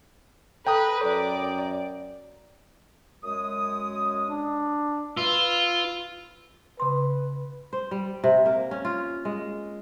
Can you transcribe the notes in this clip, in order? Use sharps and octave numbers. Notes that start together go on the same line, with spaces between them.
A4 B4 G5 A#5 D#6
F#2 D5
F#2 G#3 D#6
D4
F4 B4 E6
C#3 B4 C6
C5
G3
C3
A#3
C#4
F4
G#3